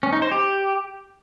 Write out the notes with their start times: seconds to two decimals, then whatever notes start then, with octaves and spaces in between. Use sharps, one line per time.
0.03 C#4
0.13 D#4
0.22 C5
0.32 G4